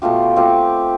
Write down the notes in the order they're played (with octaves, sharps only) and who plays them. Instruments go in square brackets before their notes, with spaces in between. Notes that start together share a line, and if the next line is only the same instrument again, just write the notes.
[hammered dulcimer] B2 A3 F4 G4
A3 C4 F4 G4